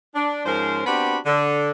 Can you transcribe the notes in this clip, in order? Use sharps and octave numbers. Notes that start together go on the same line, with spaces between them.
D4
G#2 F3 C#4 A#4 C5
B3 C4 D4 F#4 G4 B5
D3